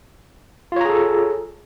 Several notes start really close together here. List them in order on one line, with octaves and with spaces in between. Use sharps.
F4 C#5 A#5 G#4 A4